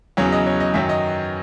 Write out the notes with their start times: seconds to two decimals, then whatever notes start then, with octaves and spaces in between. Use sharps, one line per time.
0.17 E2 C#3 F#3 C#5
0.32 D#5
0.46 C#5
0.60 D#5
0.74 F#2 D#3 F#3 E5
0.89 D#5